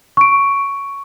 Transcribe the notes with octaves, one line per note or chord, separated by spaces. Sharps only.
C#6 D7